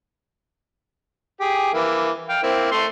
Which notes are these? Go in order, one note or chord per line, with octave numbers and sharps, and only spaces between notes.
G4 G#4
E3 A#3 E4
F5 G5
A#3 C4 E4
A3 C6